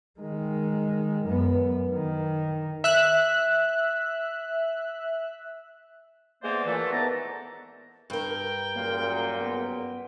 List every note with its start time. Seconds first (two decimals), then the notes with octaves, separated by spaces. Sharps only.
0.20 D#3 G#3
1.25 F#2 B3
1.92 D#3
2.84 E5 F#6
6.43 E3 G#3 A#3 B3 C5 D5
6.65 A#2 E3 A3
6.91 G#2 E3 B3 D5 A5 A#5
8.10 G2 A#4 G5
8.76 F#2 A#2 C#3 A#3
9.41 B3